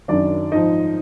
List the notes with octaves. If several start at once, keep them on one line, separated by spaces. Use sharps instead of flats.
F#2 D#3 F#3 D4 D5
G#2 F3 D#4 D#5